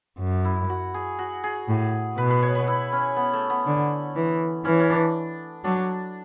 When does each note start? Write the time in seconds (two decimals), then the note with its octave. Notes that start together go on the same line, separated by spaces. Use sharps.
0.20 F#2
0.45 E4
0.70 F#4
0.94 G#4
1.19 F#4
1.44 G#4
1.69 A2
2.18 B2 B4
2.30 B4
2.43 C#5
2.55 B4
2.68 E4
2.93 C#4
3.16 B3
3.34 A3
3.50 B3
3.66 D3
4.16 E3
4.65 E3 C#4
4.80 C#4
4.90 D4
5.64 F#3 D4